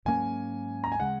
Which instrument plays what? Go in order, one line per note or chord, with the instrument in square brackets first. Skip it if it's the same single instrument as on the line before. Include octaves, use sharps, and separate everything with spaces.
[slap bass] G#2 F#3 A#3 C#4 [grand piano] G#5
[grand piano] A#5
G#5
[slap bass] C#3 G#3 [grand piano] F#5